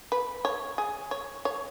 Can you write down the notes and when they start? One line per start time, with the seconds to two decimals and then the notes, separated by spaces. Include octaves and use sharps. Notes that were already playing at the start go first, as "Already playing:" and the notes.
0.12 B4
0.45 C#5
0.78 G#4
1.11 C#5
1.45 C#5